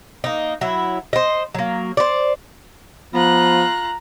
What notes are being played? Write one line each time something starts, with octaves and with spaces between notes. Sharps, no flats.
A#3 D#4
F#3 E4
C5 D#5
F#3 A#3
C5 D5
F3 B3 F4 A#5 F#6